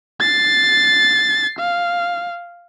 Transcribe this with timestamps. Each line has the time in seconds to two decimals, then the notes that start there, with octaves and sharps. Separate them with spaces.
0.20 A6 C7
1.59 F5